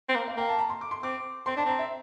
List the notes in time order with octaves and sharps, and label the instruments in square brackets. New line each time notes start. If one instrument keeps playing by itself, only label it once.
[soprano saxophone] C4
A#3
[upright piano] F5
[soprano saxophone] A#3 [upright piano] G5
[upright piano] A5
A#5
C6
D6
C6
[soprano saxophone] C4 [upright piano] D6
[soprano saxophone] C4 [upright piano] C6
[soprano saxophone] D4 [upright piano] A5
[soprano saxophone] C4 [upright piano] A#5
[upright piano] E5